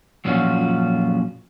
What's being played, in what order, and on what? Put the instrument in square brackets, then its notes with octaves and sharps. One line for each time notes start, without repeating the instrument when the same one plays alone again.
[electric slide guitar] F#2 A#2 F3 C#4 F4 F#4